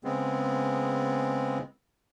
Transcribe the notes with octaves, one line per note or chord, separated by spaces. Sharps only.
C#3 G#3 B3 C4